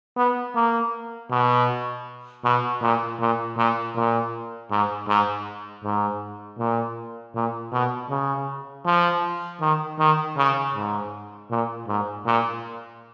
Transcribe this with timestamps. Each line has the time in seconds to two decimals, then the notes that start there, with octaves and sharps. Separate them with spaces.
0.17 B3
0.56 A#3
1.31 B2
2.45 B2
2.81 A#2
3.20 A#2
3.58 A#2
3.96 A#2
4.70 G#2
5.09 G#2
5.84 G#2
6.59 A#2
7.35 A#2
7.73 B2
8.10 C#3
8.86 F3
9.61 D#3
9.99 D#3
10.37 C#3
10.75 G#2
11.51 A#2
11.88 G#2
12.26 A#2